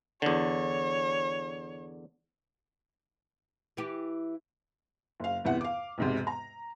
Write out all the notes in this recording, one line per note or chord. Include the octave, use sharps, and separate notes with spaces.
E2 D3 C#5
E3 E4 G4
F#1 F5
G1 E2 C3 E5 F#5
F5 D6
E1 G#2 C3
A#5